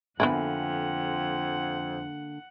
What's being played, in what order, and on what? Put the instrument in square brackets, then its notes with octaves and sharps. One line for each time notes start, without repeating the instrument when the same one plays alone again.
[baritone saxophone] F2 [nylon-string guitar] D3 A#3 G#5 [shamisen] B3 D4 E4 [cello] F#5